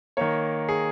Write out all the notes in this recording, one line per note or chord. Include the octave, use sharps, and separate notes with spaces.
D#3 A#3 C#5
G#4